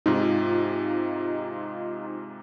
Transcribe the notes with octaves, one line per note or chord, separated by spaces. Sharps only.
G#2 C3 D#4 F4